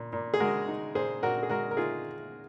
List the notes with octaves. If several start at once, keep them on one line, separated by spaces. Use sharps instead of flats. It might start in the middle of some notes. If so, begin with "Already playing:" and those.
Already playing: A#2
A#2
G#4
G#3 F#4 A#4
D#4
A#2 G#4 C5
A#2 F#4 A#4
G#4
G#3 F#4 A#4
A#4
D#4 F4 G#4